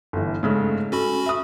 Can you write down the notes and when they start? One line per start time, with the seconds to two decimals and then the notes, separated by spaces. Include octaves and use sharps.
0.13 G1 E3
0.43 G#2 C#3 A3
0.92 C#4 F#4 A4 B5
1.26 E5 D#6